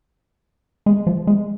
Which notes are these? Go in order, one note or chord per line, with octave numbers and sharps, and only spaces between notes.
G#3
F3
G#3